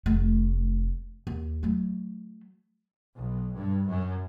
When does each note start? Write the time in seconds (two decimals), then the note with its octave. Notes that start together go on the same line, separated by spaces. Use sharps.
0.06 F1 A3
1.27 D#2
1.63 F#3 A3
3.15 B1
3.56 G2
3.87 F#2